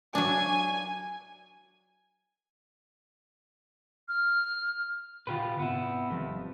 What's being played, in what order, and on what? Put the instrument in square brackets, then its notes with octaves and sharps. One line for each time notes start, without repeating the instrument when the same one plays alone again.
[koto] F#3 D4 [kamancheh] G#5
[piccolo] F6
[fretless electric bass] A#2 D3 [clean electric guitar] F4 G4 B4
[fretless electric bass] G#2 C3 C4 [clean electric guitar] B3 E4
[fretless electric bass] G#1 D#3 G3 [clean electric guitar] F2